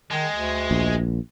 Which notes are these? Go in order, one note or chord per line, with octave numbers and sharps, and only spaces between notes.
D#3 G#3
D2
A#1